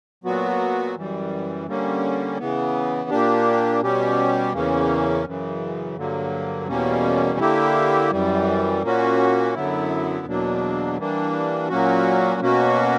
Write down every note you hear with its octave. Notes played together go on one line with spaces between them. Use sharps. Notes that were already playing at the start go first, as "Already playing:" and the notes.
A#2 F#3 B3 F#4
F#2 E3 G3
D3 G3 A#3 C#4
C#3 E3 B3
A#2 A#3 D4 G4
B2 G3 C#4 G4
E2 C#3 E3 A#3 C#4
F#2 C#3 E3
G2 D3 F#3 A#3
E2 B2 G3 A#3 C#4
D3 A#3 E4 G4
F#2 E3 G3
A#2 A#3 C#4 F#4
F#2 D3 F#3 B3 E4
E2 B2 F#3 A#3 D4
E3 G3 A#3 D4
A#2 F#3 A#3 C#4 F#4
B2 A#3 C#4 F#4